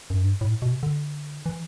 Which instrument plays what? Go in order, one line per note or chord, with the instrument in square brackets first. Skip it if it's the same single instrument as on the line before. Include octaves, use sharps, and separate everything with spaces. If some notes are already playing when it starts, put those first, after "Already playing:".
[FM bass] F#2
G2
A2
B2
C3
D3
E3